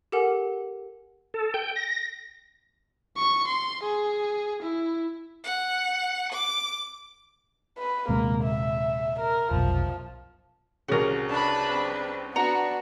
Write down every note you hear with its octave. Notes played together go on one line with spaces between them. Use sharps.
G4 A4 A#4 F#5 G#5
A4
G5
A#6
C#6
C6
G#4
E4
F#5
D6
B4
D#1 C3 G#3 A#3
E5
A#4
F1 B1 F3
C2 C#3 F#4 A#4
D4 B4 A5 B5
C4
B3 D4 F#4 F#5 A#5